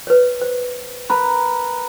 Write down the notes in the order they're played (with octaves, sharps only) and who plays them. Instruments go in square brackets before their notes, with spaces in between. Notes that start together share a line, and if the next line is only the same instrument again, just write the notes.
[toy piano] B4 C#5
C5
[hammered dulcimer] A#4 B4 [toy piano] B5